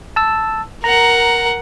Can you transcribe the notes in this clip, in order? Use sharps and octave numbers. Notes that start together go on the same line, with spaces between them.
A5 E6
A#4 F#5 A#5